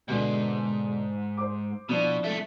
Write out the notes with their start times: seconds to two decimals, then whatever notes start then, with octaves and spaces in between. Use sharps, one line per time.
0.08 G#2 B2 D3
1.37 C5 D6
1.89 B2 F3 D4 E4
2.24 C2 A3